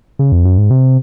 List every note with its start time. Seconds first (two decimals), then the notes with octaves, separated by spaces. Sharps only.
0.19 C#3
0.32 F2
0.45 F#2
0.58 G#2
0.70 C3